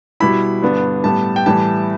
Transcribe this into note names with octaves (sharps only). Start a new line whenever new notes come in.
B2 G3 E4 B5
G2 D3 B3 D4
A2 G3 B3 A5
G5
A2 E3 G3 A5